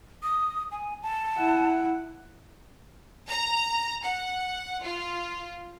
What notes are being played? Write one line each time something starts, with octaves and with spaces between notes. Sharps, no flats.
D#6
G#5
A5
E4 F#5
A#5
F#5
F4